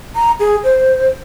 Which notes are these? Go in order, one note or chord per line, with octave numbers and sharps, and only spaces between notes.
A#5
G#4
C5